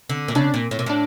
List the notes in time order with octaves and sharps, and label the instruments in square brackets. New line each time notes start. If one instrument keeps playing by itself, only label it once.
[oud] D3
A#2
[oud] C#3 [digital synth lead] D4
[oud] A#2
A2
A#2
[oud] A2 [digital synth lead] D4